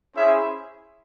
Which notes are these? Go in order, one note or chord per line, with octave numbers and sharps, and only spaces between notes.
C#4 E4 G#4 C5 E5